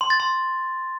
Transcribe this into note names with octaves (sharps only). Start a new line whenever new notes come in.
C6
A6
C6